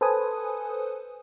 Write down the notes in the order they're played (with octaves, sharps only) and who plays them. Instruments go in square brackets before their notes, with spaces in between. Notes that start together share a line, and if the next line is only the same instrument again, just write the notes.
[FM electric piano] A4 B4 C5 G#5 D#6